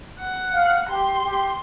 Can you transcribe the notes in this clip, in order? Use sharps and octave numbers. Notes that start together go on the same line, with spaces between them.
F#5
F5
G4 C6
G4